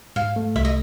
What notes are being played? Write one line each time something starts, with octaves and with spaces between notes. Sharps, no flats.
G#2 F5
A3
C2 E5
D#5